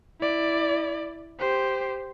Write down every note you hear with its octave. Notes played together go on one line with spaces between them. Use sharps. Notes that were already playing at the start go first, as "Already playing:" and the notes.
E4 D5
G4 C5